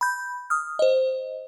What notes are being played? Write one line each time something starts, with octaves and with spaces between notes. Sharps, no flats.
B5 G6
D#6 F6
C5 D#5